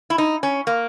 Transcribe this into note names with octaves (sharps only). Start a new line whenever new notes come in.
E4
D#4
C#4
A#3